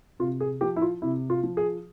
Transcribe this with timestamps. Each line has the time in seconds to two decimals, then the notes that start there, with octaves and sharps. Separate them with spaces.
0.19 C3 F4
0.40 G#4
0.61 F3 G4
0.76 E4
0.82 F4
1.02 C3 E4
1.30 F4
1.43 F3
1.57 G#4